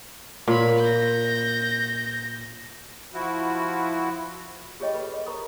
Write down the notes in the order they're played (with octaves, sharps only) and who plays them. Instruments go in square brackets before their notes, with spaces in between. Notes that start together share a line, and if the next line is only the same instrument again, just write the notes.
[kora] A#2 [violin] C#5 B5
[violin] G6 A#6
[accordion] F3 E4 F#4
[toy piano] F4 G4 G#4 C#5 D#5 G5
A4 B4 D#5 B5
D#5
A#4 C5 A#5 B5 C#6 D#6